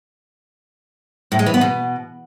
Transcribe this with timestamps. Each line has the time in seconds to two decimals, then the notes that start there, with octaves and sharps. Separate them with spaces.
1.32 A2
1.39 G#3
1.46 E3
1.54 B3
1.61 B2